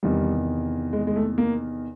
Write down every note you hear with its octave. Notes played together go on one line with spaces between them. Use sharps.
E2 C3 D#3 G3
G#3
G#3
A3
A#3